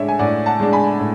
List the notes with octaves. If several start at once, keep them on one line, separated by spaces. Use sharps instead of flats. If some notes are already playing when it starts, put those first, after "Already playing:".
Already playing: A2 G#3 D4 C#5 E5
G#5
A2 D5 F#5
F#5 A5
G#3 D4
G#5 B5
A2